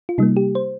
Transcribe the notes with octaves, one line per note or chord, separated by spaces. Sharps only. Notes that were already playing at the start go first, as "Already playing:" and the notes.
F4
C3 G3 A#3 D#4
G4
C5